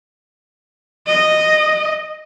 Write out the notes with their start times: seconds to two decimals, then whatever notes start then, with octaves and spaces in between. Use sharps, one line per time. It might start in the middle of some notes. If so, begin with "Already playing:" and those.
1.07 D#5